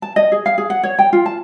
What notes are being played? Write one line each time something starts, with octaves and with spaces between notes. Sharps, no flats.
A5
D#5
G#4
F5
G#4
F#5
C#5
G5
F4
A5